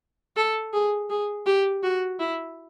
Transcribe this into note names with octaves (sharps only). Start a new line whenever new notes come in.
A4
G#4
G#4
G4
F#4
E4